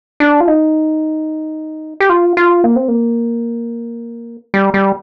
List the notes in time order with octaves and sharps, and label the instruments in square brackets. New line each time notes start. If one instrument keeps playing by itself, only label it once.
[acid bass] D4
F4
D#4
G4
F4
F4
A#3
C4
A#3
G3
G3